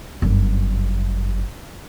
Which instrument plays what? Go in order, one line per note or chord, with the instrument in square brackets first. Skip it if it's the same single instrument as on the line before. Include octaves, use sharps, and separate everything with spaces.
[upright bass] G1 F#2